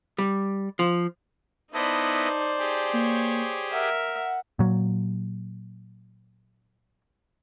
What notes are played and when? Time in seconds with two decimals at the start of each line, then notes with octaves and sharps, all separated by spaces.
0.18 G3
0.79 F3
1.74 B3 D#4 E4 C5 D5 D#5 A5
2.59 G4 G#4
2.93 A#3 C#5
3.72 A#4 E5 F#5
4.59 A#2 F#3